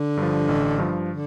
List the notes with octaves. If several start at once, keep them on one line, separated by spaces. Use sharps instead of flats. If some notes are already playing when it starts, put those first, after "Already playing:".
Already playing: D3
G2 F3
A1
G2 F3
D3